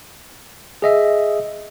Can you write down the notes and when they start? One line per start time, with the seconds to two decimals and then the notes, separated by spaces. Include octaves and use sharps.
0.82 G#4 D#5 E5